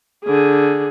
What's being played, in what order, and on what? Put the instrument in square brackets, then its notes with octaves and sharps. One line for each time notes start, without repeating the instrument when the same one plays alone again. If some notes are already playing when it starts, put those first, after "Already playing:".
[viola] D3 G#4